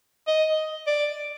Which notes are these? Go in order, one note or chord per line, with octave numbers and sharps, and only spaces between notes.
D#5
D5